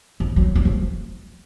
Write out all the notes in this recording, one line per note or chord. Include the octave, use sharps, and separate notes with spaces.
F3
F#3
F#3
F3